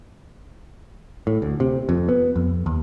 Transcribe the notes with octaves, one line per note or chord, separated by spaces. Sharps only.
A2
D2
C3
F2
B3
F2
D#2